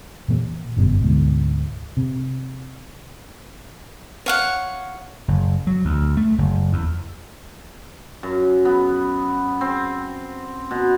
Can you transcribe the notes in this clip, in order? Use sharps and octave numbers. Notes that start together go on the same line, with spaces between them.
A#2 E3 A#3
G1 F#2 B2
D2 G#2 B2
C3
C#5 F5 F#5
F#1
F#3
D2
A3
F#1
E2
F#2
B3
C4
B2